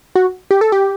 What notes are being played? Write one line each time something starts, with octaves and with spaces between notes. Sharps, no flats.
F#4
G4
A4
G4